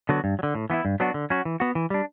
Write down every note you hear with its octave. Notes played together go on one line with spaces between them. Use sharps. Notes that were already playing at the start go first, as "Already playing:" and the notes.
D3 F#3 B3 F#4
G2
F#3
D3
A2
E3 B3 E4
G2
F#3 B3 D4 F#4
D3
F#3 C#4 F#4
E3
B3 F#4
E3
G3 D4